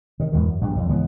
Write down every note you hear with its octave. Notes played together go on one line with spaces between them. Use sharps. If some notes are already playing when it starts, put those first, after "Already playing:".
C3 D#3
E2 G#2 B2 D#3
F#2
A#1 G2 B2 D4
B1 F2
C#2 G#2 E3 B3